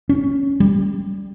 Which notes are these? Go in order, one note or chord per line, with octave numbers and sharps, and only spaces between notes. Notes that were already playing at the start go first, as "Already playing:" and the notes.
C#4
G3